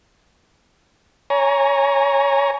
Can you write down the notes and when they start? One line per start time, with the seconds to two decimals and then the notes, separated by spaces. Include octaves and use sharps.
1.30 C#5 G#5 A#5